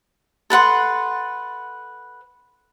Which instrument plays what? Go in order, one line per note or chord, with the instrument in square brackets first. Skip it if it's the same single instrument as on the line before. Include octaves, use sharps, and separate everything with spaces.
[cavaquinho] A4 B4 F#5 C6